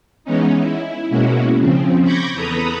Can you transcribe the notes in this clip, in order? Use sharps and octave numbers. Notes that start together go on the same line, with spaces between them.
E3 G#3 B3 C#4 D#4
E4
B2 G#3 A#3 C#4 E4 F#4
C#3 F3 C4
B5 C#6 D6 G6 G#6 A#6
E2 A4 B4 A#5 B5 D#6